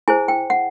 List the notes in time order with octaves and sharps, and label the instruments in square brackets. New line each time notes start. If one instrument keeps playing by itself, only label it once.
[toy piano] E4 G#4 C5 G#5
G5
F#5